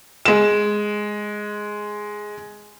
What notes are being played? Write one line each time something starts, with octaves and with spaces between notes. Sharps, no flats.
G#3 E7